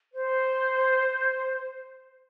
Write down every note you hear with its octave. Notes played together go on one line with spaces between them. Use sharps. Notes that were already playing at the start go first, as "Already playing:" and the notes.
C5